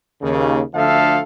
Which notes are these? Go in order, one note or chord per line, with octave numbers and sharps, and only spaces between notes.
D#2 C#3
D2 D3 F3 A4 E5 F5